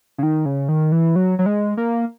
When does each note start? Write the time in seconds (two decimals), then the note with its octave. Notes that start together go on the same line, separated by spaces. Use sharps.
0.18 C#3
0.23 D#3
0.46 C#3
0.69 D#3
0.92 E3
1.16 F#3
1.39 F#3
1.46 G#3
1.77 A#3